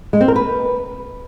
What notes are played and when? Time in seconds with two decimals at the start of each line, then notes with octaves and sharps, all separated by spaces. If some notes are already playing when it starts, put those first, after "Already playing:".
0.13 G#3
0.21 C4
0.28 A#4
0.36 B4